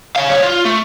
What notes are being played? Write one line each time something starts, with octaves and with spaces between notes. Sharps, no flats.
C#5 F5
G3 C#5
F4
A3